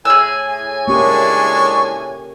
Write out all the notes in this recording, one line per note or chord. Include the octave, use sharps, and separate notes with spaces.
A2 G#4 G#5 E6
G#3 A#3 C#4 D4 G4 C#6